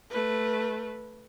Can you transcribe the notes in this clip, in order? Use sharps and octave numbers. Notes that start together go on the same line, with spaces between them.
A3 B4